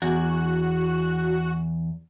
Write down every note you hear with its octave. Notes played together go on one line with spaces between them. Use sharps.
E2 F#4